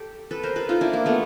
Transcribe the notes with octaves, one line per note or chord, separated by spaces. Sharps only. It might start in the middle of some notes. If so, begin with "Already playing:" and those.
Already playing: G4 A4
A4 B4
A#4 C5
A4 B4
D#4 F4
D4 E4
A#3
A3 B3